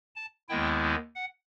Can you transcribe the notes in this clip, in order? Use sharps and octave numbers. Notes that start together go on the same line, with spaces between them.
A5
D#2 D#3 G#3 B3 E4 G5
F#5